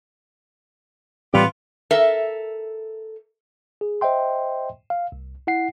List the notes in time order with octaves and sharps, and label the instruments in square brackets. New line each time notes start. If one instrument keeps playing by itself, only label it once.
[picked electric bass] A2 E3 C4 [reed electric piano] G3 [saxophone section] B3 F4 G4
[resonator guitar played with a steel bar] A4 A#4 E5
[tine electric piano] G#4
C5 D#5 E5 G5 C6
F5
C2
E4 F#5 C7